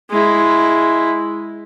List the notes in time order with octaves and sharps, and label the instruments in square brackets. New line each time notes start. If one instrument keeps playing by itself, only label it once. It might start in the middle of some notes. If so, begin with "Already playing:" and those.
[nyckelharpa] G#3 E4